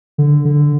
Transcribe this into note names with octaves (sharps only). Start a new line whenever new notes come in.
D3
D3